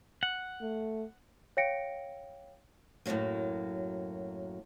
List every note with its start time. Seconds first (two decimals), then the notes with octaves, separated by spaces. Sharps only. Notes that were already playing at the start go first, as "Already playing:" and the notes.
0.23 F#5
0.62 A3
1.57 C#5 F5 G5 A#6 C#7 D7
3.06 F#2 A2 C3 F#3 A#3